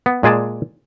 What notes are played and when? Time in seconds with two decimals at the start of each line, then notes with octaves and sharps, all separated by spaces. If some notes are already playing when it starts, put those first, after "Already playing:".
0.06 B3
0.23 A#2 G#3 G#4 D5 A5